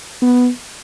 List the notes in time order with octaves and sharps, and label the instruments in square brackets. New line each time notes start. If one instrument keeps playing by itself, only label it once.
[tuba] B3